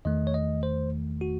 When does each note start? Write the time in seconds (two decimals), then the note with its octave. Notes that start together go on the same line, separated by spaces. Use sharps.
0.05 E2 D#3 A3 D#5
0.27 C#5
0.34 D#5
0.63 C5
1.21 F#4